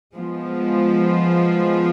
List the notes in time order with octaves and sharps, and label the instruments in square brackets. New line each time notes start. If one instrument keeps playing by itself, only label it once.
[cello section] F3 G#3 B3 F4